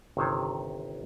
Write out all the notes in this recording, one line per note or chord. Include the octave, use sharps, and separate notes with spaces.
G1 C3 D#3 C5 C#5 A5